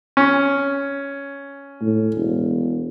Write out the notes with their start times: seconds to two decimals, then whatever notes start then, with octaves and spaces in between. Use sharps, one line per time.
0.17 C#4
1.81 A2
2.15 E1